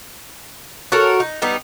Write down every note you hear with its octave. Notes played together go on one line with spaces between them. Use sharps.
F#4 A4 A#4 C#5
D#4
G3 B3 D#4